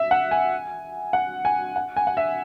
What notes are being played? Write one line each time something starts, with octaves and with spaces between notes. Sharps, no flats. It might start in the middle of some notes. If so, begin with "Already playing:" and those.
Already playing: E5
F#5
G#5
F#5
G#5
F#5
G#5
F#5
E5